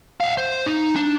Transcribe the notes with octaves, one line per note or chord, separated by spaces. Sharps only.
E5 F5
C5
D#4
D4